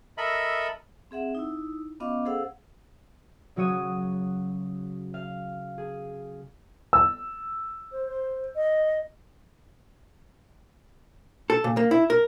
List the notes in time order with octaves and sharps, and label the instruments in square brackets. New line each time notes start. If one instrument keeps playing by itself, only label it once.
[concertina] A4 A#4 D#5 E5 B5
[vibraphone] C4 G#4 E5 F#5
D#4 E4
B3 C#4 F4 D#5 F5 D6
G#4 A4 C5 F5 F#5 E6
[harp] C#3 F#3 F#4 C#5 D#6
F5
G#4
[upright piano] E6
[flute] C5
C5
D#5
[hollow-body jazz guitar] A4
A#2
A#3
E4
A#4